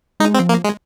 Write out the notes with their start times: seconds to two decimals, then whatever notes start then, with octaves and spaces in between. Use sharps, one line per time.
0.20 G#3 D#4
0.34 C4
0.40 F3
0.49 A#3
0.64 G#3